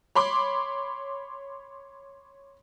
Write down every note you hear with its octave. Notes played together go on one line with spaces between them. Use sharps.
C#5 B5 C6 D6